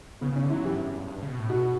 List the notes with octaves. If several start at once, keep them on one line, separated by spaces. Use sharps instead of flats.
C#3 B3
C#3 C#4
D3
E4
F#3
E3 G4
G2
F#2
G2
G2
G2
C#3
B2
A2
B2 F#4